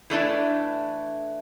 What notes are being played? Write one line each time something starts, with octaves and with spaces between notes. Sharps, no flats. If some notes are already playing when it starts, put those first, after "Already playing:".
E3 A3 D4 E4